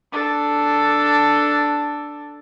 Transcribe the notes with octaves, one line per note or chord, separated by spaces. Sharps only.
D4 A4